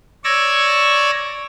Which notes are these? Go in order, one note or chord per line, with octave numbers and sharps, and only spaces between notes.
C#5 D5 C#6 E6 G#6 A#6